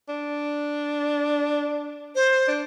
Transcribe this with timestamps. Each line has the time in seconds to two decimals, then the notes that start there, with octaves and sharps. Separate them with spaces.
0.08 D4
2.15 C5
2.48 D4